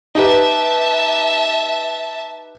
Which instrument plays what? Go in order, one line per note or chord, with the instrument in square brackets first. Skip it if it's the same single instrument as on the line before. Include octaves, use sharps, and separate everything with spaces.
[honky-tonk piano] D#4 G4 B4 [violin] E5 A5